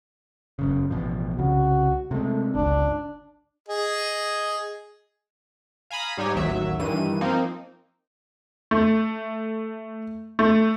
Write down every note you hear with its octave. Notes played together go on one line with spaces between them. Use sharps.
G1 F#2 C#3
A1 B2 F3
C2 C#3 F#4
C3 G#3 A3
G1 C#2 D4
G#4 D#5
F5 G#5 A#5 B5 D#6
G#2 G3 D#4 G4 C#5 G#5
A1 D#2 F#3 E5
G2 D#3 E3 D#7
F3 A#3 C4 D#4
A3
A3